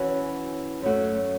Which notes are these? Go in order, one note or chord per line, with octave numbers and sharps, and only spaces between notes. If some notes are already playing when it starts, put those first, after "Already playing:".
Already playing: E3 C#4 F#4
F#2 F#3 A3 F#4